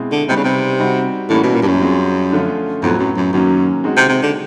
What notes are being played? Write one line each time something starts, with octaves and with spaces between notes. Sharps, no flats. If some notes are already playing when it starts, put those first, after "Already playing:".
Already playing: B2 G#3 C4 E4
D3
C3 G3 B3 D#4
C#3
C3
G3 C4 D#4 F#4
A2 E3 G3 A#3 C#4 F#4
B2
A#2
G2
F#2
G3 C4 F4 G#4
D3 F3 A3 C#4 F4
F2 A2 F#3 B3
F#2
F#2
F#2 D#3 F#3 A#3 C#4
G#3 C4 D#4 F#4
C3
C3
D3